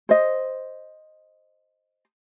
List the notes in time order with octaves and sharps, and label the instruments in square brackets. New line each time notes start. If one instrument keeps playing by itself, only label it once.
[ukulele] C5 D#5